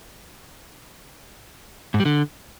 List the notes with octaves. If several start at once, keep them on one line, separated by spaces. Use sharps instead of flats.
G#2
G3
D3